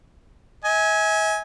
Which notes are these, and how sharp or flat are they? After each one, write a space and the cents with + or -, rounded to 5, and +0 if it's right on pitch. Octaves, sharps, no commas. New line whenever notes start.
E5 -45 G#5 +5